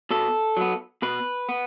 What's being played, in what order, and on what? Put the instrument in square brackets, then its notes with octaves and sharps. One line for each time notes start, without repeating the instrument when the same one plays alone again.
[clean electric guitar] B2 A4
F#3 B3
B2 B4
B3